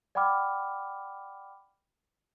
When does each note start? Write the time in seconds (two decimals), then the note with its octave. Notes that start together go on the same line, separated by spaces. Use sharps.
0.15 D5 F#5 G5 B5 D6 F6